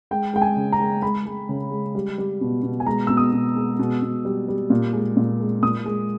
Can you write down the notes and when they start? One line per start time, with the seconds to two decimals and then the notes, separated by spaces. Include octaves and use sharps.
0.11 G#3 G5
0.34 G#3 G5
0.42 G#5
0.57 C#3
0.72 A#5
0.79 G#3
1.02 G#3 B5
1.26 G#3
1.49 C#3
1.71 G#3
1.95 G3
2.18 G3
2.41 B2
2.63 B2
2.80 G#5
2.86 G#3 A#5
3.07 B2 E6
3.17 D#6
3.33 B2
3.56 G#3
3.79 B2
4.02 B2
4.25 G3
4.48 G3
4.70 A#2
4.93 G#3
5.17 A#2
5.40 G#3
5.63 A#2 D#6
5.86 G#3